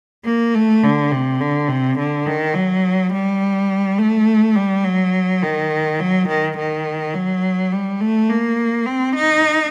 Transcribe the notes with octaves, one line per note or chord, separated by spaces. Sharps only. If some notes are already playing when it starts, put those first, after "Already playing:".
A#3
A3
D3
C3
D3
C3
D3
D#3
F#3
G3
A3
G3
F#3
D#3
F#3
D#3
D#3
F#3
G3
A3
A#3
C4
D#4